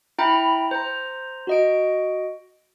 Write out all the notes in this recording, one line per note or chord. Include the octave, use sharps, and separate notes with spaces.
E4 G5 A#5 B5
C5 A#5
F#4 D#5 D7